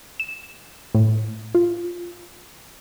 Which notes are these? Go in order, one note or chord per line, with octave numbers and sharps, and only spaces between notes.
E7
A2
F4